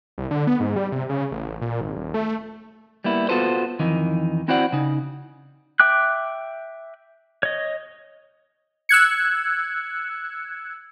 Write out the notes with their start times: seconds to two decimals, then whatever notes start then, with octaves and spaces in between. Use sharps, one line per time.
0.18 C2
0.31 D3
0.47 B3
0.60 G#2
0.76 G3
0.92 C3
1.09 C#3
1.32 A1
1.62 A#2
1.81 G#1
1.96 D#1
2.14 A3
3.04 G3 A#3 B3 E4
3.29 B3 F4 F#4 A4 B4 C5
3.80 F2 D#3 E3 D#4
4.48 C4 E4 F#4 C5 D5 F#5
4.72 C#3 D#4
5.80 E5 G5 D6 F#6
7.43 C#5 D#5
8.89 E6 F#6 G#6 C#7